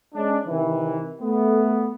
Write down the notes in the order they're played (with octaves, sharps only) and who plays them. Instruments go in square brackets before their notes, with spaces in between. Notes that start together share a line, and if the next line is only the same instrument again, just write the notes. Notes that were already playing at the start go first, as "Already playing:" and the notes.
[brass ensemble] G#3 C#4 D4
C3 D#3 E3
A3 B3